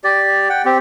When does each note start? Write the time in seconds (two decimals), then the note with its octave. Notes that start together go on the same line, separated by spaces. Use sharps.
0.04 G4 D5
0.50 F#5 G5
0.65 C4 G4